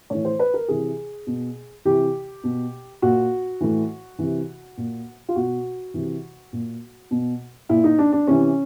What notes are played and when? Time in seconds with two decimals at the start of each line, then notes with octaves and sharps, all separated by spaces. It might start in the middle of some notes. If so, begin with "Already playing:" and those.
0.10 A2 E3 C#5
0.25 C5
0.39 B4
0.54 A#4
0.68 C3 E3 G#4
1.27 B2
1.85 C3 E3 G4
2.44 B2
3.02 A#2 F#4
3.61 A2 E3
4.19 C3 E3
4.77 A#2
5.29 F4
5.36 B2 F#4
5.94 C3 E3
6.53 A#2
7.11 B2
7.69 A#2 E4
7.84 D#4
7.98 D4
8.13 D4
8.27 C3 E3 C#4